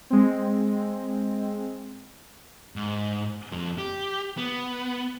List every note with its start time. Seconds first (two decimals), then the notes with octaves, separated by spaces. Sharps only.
0.10 G#3 C4
2.76 G#2
3.52 F2 F3
3.78 G4
4.37 B3